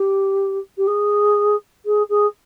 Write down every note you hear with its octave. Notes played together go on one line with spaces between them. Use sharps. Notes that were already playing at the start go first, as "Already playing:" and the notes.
Already playing: G4
G4
G#4
G#4
G#4